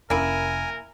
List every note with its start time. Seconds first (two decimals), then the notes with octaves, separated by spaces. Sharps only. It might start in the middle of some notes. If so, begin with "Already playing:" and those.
0.10 F1 A#3 C#4 D4 E4 A#4 G#5